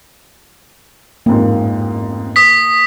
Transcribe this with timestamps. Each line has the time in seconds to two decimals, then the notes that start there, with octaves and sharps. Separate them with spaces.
1.26 A1 F2 G#2 A#3
2.36 D#6 B6